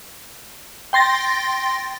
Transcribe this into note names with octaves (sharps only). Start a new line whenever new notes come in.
G5 C6 A6 A#6